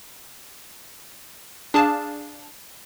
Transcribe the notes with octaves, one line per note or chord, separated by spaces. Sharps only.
D4 G#4 F5 A5